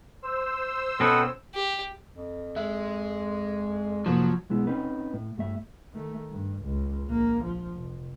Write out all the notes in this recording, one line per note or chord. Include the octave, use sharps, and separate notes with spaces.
C5 E6
B2 C4 C#4 A4 B4 D#5 F#5
G4
F2
G#3 E5
F2 G#2 C3 F3 F#3 A#3
B1 G#3 B3 E4
C4 C#4 D#4 B4
A2
G2 A3 E5
D#3 A3
G2
C#2
A#1 A#3
F3
F1